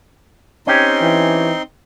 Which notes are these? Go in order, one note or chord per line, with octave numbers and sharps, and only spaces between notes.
C4 C#4 D#4 G4 C6
E3